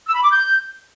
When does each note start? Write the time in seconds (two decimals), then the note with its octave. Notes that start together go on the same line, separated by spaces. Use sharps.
0.08 E6
0.16 B5
0.23 D6
0.31 G6